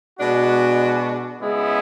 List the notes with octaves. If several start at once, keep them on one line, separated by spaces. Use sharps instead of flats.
B2 G#3 D4 F#4
C#3 G#3 B3 E4